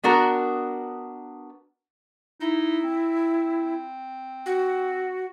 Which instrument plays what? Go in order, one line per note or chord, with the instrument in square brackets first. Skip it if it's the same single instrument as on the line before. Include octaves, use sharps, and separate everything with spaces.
[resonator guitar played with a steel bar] B3 D4 F#4 A#4
[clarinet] D#4 [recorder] E4
[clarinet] C4
[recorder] F#4